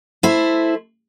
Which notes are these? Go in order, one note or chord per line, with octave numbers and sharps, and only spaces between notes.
A3 E4 C5